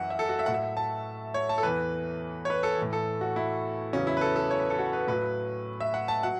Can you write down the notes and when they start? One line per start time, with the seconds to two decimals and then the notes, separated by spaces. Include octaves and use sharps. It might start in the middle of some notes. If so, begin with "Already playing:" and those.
Already playing: F#2 E3 E5 F#5
0.10 E5
0.19 A4
0.29 F#4
0.39 E5
0.46 A2 F#3 F#5
0.54 E5
0.77 A5
1.34 C#5
1.49 A5
1.58 A4
1.63 E2 E3 B4
2.45 C#5
2.50 B4
2.63 A4
2.78 A2 E3
2.93 A4
3.21 F#4
3.36 E4
3.93 E2 C#3 F#3 C#4
4.07 E4
4.17 B4
4.21 A4
4.36 A4
4.51 C#5
4.60 B4
4.70 A4
4.79 F#4
4.93 B4
5.07 A2 F#3 B4
5.80 E5
5.94 F#5
6.08 A5
6.23 F#3 F#5